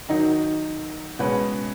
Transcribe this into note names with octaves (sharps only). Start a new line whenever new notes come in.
D#3 F#3 D#4
B2 G#3 C#4 B4